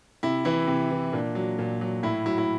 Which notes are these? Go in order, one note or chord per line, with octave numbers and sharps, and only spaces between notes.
C3 E4
E3 E4
C3
E3
A#2 D4
F#3
A#2
F#3
A2 E4
F#3 E4
E4